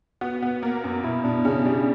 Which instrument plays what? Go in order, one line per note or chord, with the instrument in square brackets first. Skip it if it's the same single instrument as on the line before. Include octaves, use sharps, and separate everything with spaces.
[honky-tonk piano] B3 [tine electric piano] F#4
[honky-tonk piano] B3
A#3
F#2
[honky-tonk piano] B2 [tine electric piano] E4
[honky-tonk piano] B2 [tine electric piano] D4
[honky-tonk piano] C#3 [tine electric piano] C#4
[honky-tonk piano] G3